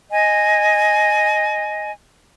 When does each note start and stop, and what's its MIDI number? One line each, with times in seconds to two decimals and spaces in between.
0.11 1.92 75
0.11 1.92 80